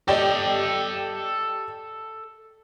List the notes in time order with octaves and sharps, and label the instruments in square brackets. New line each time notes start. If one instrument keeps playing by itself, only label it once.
[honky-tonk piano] G4 D5 D#5 [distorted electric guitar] A4 G5